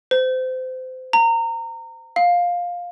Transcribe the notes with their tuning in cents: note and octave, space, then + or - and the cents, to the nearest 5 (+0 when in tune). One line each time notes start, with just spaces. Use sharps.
C5 -25
A#5 -25
F5 +10